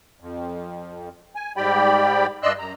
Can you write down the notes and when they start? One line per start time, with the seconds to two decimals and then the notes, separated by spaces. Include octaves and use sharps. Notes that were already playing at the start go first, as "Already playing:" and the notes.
0.20 F2
1.35 G#5
1.57 G#2 G3 G4 D5 G5 B5
2.43 G2 D5 D#5 C6 E6 F#6
2.59 F#2 A#5